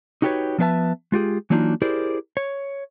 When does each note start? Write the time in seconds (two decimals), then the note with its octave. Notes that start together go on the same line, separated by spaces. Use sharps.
0.22 D#4 F#4 G4 A4 B4 C#5
0.58 F3 B3 D4 B4 E5 A5
1.12 G#3 F4 G4 G#4
1.50 E3 F#3 A#3 D4 D#4 F4
1.82 E4 G4 G#4 A#4 C5 D5
2.37 C#5